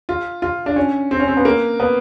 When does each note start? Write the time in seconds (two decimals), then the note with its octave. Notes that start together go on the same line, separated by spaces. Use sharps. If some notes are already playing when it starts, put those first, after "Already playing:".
0.09 F4
0.42 F4
0.66 D4
0.76 C#4
1.11 C4
1.20 C#4
1.28 C4
1.37 B3
1.45 A#3
1.80 B3